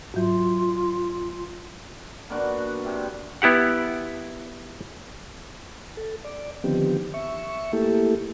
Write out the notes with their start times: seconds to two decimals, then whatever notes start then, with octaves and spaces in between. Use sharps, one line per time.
0.14 G#2 F#3 F4
2.30 A#3 B3 D4 F#4
2.84 C3 G4 E5
3.42 B3 E4 G4 F#5
5.97 A4
6.25 D5
6.64 D3 D#3 F3 B3 C4 G4
7.14 E5 C#6
7.73 A3 A#3 E4 G4 A4